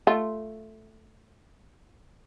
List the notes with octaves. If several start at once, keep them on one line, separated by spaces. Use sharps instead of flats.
A3 F4